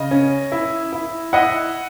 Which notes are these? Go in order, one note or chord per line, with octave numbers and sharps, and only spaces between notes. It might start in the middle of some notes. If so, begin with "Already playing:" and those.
Already playing: C#3 D#5
C#4
E4
E4
E4 D#5 F#5